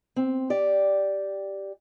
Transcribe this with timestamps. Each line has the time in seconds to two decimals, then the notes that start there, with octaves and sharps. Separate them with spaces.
0.16 C4
0.50 G4 D5